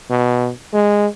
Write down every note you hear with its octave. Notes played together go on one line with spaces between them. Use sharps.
B2
G#3